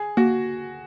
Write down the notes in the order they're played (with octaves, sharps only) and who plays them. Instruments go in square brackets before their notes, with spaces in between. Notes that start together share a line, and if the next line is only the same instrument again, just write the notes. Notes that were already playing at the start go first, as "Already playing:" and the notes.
Already playing: [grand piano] G#4
[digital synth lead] A#3 [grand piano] F#4